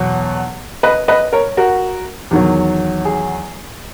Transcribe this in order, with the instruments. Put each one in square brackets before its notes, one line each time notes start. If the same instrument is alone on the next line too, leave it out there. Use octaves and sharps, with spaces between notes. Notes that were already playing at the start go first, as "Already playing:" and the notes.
Already playing: [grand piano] E2 B2 F#3
B4 D#5
B4 D#5
A#4 C#5
F#4 A#4
E2 D#3 F#3
G#4